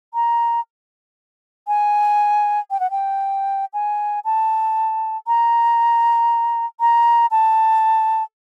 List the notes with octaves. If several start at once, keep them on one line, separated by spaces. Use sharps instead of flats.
A#5
G#5
G5
F#5
G5
G#5
A5
A#5
A#5
A5